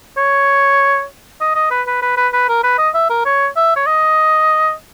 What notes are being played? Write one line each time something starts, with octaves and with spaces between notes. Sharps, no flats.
C#5
D#5
D#5
B4
B4
B4
B4
B4
A#4
B4
D#5
E5
A#4
C#5
E5
C#5
D#5